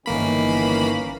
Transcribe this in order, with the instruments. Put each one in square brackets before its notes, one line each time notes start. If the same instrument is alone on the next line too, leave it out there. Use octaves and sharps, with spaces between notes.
[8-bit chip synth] G1 A#3 B5 [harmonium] D#3 E3 C#4